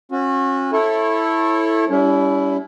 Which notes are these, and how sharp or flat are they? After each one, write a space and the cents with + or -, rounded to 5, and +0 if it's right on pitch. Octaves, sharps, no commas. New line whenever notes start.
C#4 -35 F#4 -35
E4 +0 A4 +0 C#5 -35
G3 +0 C#4 +40 E4 +0